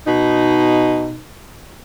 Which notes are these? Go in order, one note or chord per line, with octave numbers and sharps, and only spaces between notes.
B2 D#4